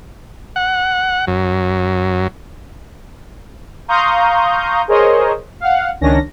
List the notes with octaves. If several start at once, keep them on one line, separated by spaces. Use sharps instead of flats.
F#5
F#2
F5 A#5 C6 C#6 D#6 G6
G#4 A#4 C5 C#5 D#5
F5 F#5
C#2 D#3 C#4 D4 A#6